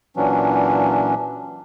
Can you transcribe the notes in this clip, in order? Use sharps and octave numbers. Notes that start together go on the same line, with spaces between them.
A#2 E3 F#3 C#4 D4